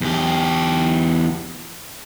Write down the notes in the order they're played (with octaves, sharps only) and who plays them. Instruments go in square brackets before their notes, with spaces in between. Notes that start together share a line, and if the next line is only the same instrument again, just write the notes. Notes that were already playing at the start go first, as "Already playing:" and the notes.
[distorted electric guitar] E2 G4